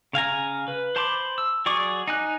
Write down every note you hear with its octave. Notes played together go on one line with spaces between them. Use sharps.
C#3 F5 G#5 A#5
B4
C5 A5 B5 C6 D6
E6
F#3 G#4 D5 C#6 D6
D#4 G#5 F#6